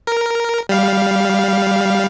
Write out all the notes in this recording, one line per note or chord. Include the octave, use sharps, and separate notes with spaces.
A#4
G3 F5